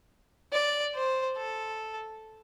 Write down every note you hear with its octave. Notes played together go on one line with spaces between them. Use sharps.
D5
C5
A4